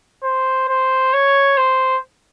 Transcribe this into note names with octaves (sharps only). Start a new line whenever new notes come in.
C5
C5
C#5
C5